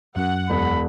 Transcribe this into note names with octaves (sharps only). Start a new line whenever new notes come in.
F#2 F#5
E1 B5